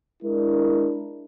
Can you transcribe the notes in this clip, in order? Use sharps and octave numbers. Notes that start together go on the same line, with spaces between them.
G#3 D4 E4 A#4